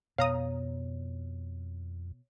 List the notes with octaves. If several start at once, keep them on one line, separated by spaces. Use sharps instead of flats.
F2 B2 C#5 F5 A#5 D#6